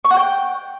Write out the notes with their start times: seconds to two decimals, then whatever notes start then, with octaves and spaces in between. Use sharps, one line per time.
0.05 C#6
0.11 F#5
0.17 G5